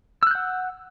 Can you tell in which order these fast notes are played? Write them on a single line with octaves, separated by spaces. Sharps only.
E6 F#6 G6 F#5